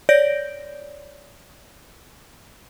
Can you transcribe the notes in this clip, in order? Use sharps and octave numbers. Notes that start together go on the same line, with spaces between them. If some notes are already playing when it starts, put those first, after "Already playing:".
C#5 D5 G6 A#6 D7